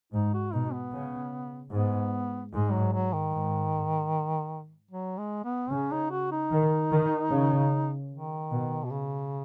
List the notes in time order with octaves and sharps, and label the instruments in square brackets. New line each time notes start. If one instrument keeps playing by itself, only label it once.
[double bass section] G#2 [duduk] D#4
[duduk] F#4
[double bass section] B2 [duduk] D#4
[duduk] B3
[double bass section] C#3
[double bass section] G#2 [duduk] B3
[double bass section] G#2 [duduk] G#3
[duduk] F#3
F#3
D#3
[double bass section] G#2
[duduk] F#3
G#3
B3
[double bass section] C#3 [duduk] C#4
[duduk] D#4
F#4
D#4
[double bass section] D#3
D#3
C#3
[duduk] D#3
[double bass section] B2
[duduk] B2
C#3